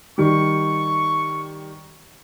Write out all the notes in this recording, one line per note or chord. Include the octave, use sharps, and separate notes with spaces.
D#3 G3 C#6